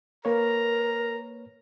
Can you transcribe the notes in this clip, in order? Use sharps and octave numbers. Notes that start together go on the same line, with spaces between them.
A#3 A#4 B4 C#5 A#5